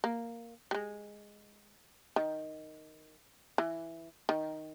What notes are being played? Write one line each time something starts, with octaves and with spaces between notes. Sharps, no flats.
A#3
G3
G#3
D#3
E3
D#3